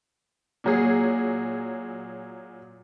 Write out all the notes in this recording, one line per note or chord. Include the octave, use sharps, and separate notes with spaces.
A#2 F#3 G#4